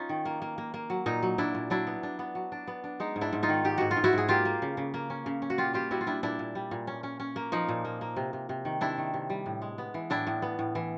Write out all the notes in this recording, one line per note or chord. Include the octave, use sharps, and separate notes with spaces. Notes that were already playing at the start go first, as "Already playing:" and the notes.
Already playing: C#4 D#4 F4
D#3
A#3
A#3
A#3
A#3
F#3
A#2 D#4
F#3
A#2 D4 E4
A#2
F#3 D4 E4
B3
D4
B3
F#3
D4
B3
D4
G#3 D#4
G#2
D4 E4
G#2
D#4 F4
D#3
G#2 G4
G#2 F#4
F4
G#2
E4 F#4
G#2 G#4
A#3 F4 G4
A#3
C#3
C#3
A#3
C#4
C#3
C#4
F#4
A#2 F4 G4
G3 F4 G4
G3 E4 F#4
F4
G3 D4 E4
A#2 D4 E4
A#2
G3
A#2
C#4
C#4
C#4
A#3
F3 D#4
A#2
A#3
A#3
C3
C3
C3
D#3
C3 D4 E4
D#3
C3
G3
A2
G#3
B3
E3
A2 D4 E4
A2
B3
A2
E3